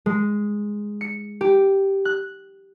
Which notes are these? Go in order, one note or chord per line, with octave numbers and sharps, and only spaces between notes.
G#3
C#7
G4
F#6